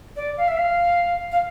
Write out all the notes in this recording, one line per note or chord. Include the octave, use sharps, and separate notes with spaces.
D5
F5
E5
F5
F5